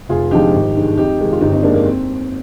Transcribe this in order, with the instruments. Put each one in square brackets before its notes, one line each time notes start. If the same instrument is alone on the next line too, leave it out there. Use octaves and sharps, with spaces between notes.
[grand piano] F1 F4 G#4
F2 D3 F3 G#3 D#4 G4
G#1
G2 D#3 G#3
F2 D#4 G4
C3 D#3 G#3
F4
G1 D#4 G4
C4 D#4
F2 D3 G#3 A#3 D4
A#3
C4